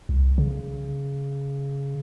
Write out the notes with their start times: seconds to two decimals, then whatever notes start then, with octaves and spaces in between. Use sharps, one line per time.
0.09 C2
0.38 C#3